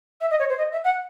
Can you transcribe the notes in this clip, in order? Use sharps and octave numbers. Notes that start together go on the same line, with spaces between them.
E5
D#5
C#5
C5
D#5
E5
F#5